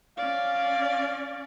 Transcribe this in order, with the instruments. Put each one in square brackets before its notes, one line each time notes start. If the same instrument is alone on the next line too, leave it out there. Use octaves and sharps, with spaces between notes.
[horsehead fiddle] C#4 D5 [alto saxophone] F5